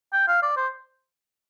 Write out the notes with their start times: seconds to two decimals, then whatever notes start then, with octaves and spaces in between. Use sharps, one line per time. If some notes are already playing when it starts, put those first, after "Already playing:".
0.13 G5
0.28 F5
0.42 D5
0.57 C5